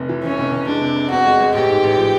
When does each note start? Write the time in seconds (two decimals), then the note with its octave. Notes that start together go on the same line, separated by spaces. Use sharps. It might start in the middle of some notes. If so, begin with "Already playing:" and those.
Already playing: F1 C3
0.09 E3
0.23 E3 C#4
0.38 F1
0.52 F1
0.67 G#3 D4
0.81 C3
0.96 C3
1.10 E2 F#4
1.26 G#3
1.40 G#3
1.55 A1 G4
1.69 G#2
1.84 A1
1.98 F3